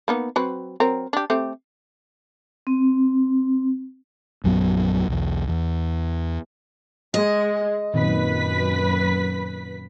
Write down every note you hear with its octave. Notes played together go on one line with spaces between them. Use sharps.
A#3 B3 D#4
F#3 C4 B4
F#3 C4 A#4
D4 G4
A3 C4 G4
C4
A#1 F#2 F#3 B3
B1 E2
E2
G#3 D#5
F#2 A#2 D#3 C4 B4 B6